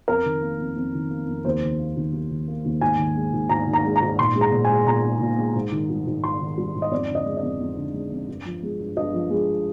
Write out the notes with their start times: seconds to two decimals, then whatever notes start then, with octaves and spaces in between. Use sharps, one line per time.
0.08 F2 A#4
0.25 D#3
0.42 A#3
0.60 F2
0.77 F2
0.94 D#3
1.10 A#3
1.27 F2
1.45 D#2 C5
1.63 D#3
1.79 A#3
1.97 D#2
2.13 D#2
2.30 D#3
2.48 A#3
2.65 D#2
2.81 G#2 G#5
2.98 D#3
3.15 G#3
3.33 G#2
3.49 G#2 A#5
3.67 D#3
3.73 A#5
3.85 G#3
3.96 A#5
4.02 G#2
4.19 A#2 C6
4.36 G#3
4.41 A#5
4.52 A#2
4.65 G#5
4.69 G#3
4.86 A#2 A#5
5.04 G#3
5.20 A#2
5.38 G#3
5.55 G#2
5.72 D#3
5.90 G3
6.07 G#2
6.24 G#2 C6
6.41 D#3
6.58 G3
6.75 G#2
6.82 D#5
6.91 F2 D5
7.09 D3
7.15 D#5
7.26 G#3
7.37 D#5
7.43 F2
7.60 F2
7.77 D3
7.94 G#3
8.11 F2
8.29 G2
8.46 F3
8.63 G#3
8.80 G2
8.97 G2 D#5
9.14 F3
9.30 G#3